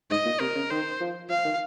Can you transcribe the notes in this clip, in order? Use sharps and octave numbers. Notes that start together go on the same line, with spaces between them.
G#2 D#5
A#2
C3 A#4
C#3
D#3 C5
F3
F3 F5
D#3